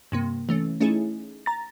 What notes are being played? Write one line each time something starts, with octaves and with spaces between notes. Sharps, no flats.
G2 C3 A#3
E3 A3 C#4
A3 C#4 D#4 E4 G#4
A#5 A6